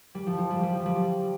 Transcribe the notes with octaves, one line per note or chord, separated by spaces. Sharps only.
G3
F3
F3
G3
G3
F3
G3